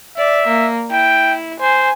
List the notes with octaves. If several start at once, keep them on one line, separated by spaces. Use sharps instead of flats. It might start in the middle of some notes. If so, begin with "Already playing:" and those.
D5 E5
A#3
E4 G5
C5 G#5